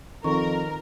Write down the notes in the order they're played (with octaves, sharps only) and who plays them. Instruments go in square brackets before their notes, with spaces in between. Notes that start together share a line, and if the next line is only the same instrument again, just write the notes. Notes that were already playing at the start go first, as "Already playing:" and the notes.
[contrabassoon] F2 [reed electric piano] D#3 D#4 [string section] A#4 [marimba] C#6